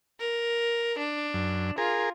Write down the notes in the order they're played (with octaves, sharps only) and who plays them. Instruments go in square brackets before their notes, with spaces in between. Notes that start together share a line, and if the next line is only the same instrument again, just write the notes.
[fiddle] A#4
D4
[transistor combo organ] F#2
[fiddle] F4 [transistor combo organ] G#4 A#4